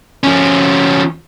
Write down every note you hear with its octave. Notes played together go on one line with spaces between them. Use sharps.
F3 C#4